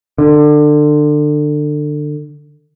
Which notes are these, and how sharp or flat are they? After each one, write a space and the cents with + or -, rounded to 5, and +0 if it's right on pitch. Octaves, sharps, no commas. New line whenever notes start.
D3 +25